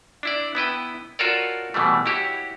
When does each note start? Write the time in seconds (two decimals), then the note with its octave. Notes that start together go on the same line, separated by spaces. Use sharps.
0.23 D4 E4 D5
0.55 B3 E4 B4 G5
1.19 F4 F#4 A4 A#4 C#5 D5
1.74 B2 E3 G3 A3
2.06 E4 F#4 G4 C#5